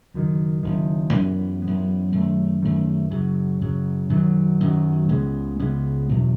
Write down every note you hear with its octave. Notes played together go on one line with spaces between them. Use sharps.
F#1 F#2 D#3
F#1 F#2 D#3
F#2 E3 B3
F#2 E3 B3
F#2 D#3 A3
F#2 D#3 A3
F#2 C#3 F#3
F#2 C#3 F#3
F#2 D#3 F#3
F#2 D#3 F#3
C#2 C#3 G#3 B3
C#2 C#3 G#3 B3
F#1 E2 B2 F#3